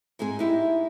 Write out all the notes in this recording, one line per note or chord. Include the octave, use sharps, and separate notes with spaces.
G#2 G#3 C4 G#4
D#4 E4 G4